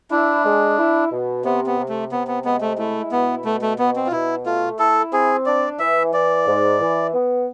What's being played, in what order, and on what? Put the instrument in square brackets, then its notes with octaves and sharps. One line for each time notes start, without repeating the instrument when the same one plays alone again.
[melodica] D4 [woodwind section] E4
[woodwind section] G#3
E4
B2
[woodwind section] C3 [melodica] B3
[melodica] B3
[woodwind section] C3
[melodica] A3
[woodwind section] C3 [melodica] B3
[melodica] B3
[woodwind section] G#3 [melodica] B3
[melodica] A3
[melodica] A3 [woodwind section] E4
[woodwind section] B2 [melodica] B3
[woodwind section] B2 [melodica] A3
[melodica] A3
[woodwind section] B2 [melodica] B3
[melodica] C4
F4
[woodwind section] B2 [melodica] E4
[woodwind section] A3 [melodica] F4
[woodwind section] E4 [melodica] A4
[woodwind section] C4 [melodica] G#4
[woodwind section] D4 [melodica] D5
[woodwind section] E3 [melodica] E5
[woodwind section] E3 [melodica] D5
[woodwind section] G#2
E3
B3